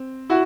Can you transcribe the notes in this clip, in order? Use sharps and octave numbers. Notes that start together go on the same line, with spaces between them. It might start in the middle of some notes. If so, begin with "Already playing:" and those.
Already playing: C4
E4 F#4